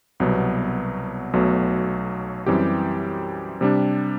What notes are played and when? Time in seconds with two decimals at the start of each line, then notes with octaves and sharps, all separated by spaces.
0.20 C2 B2 F#3 B3
1.33 B1 B2 F#3 A3
2.46 F#2 E3 G3 C4 G4
3.61 C3 G3 D4